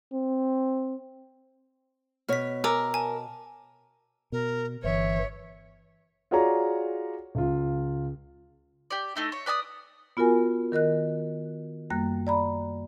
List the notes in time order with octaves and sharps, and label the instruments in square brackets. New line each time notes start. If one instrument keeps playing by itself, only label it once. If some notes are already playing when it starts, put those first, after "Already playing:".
[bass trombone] C4
[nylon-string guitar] B2 C#5 [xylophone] F6 B6
[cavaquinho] A#4 [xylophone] G#5 D6 E6
[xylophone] G#5 A5
[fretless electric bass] B2 [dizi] A#4
[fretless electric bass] G1 [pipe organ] E3 [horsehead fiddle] C#5 [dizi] E5
[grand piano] F4 F#4 G#4 C#5 D5 A#5
C#2 F4
[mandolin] G4 D5
A3 D#4 E4
C#5
B4 D5 A5 D#6
[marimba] B3 F4 F#4 A#4 G#5
D#3 A#4 D#5 F#6
F#2 G3 A#3 F#6
D5 A#5 B5